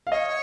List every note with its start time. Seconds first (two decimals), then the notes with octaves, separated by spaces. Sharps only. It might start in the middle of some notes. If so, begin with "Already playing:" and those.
0.07 F5
0.11 C#5 D#5